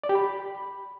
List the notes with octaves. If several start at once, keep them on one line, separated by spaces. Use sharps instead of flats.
D5
G4
B5